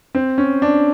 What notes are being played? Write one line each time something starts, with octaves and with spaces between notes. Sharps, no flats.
C4
C#4
D4